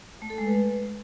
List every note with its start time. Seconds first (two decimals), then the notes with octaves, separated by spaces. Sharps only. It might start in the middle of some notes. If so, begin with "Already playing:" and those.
0.22 A3
0.30 A4
0.38 G#3
0.46 B4